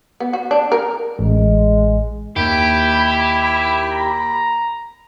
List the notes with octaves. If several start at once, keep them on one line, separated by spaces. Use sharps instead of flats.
B3
F#4
D4
A#4
A1 G#3
D#2 E4 G4 B5
A#5